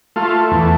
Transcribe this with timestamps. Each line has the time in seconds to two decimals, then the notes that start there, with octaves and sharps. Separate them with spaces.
0.16 A3 F4
0.51 E2